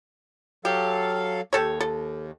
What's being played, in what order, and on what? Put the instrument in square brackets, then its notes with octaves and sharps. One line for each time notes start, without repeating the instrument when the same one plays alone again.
[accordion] F#3 A4 F5 [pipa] G4
[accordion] D#2 [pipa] G4 A4 C#5
[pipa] A4